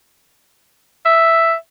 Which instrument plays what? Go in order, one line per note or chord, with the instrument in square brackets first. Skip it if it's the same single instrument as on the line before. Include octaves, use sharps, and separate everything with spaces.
[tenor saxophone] E5